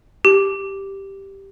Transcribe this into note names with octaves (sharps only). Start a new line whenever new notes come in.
G4